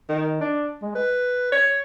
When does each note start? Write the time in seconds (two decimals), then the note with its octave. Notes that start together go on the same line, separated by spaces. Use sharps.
0.09 D#3
0.41 D4
0.82 G#3
0.95 B4
1.52 C#5